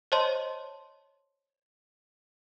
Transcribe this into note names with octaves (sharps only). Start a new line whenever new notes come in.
C5 C#5 D#5 A5 C6